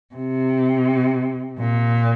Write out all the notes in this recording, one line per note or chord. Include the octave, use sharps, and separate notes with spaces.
C3
A#2